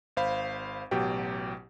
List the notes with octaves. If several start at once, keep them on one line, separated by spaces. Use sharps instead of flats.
G#1 C5 F5 B5
A1 B2 F#3 G4 G5